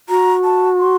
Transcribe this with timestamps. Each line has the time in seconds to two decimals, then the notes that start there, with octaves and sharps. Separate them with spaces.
0.09 F#4 A#5
0.44 A5
0.79 C6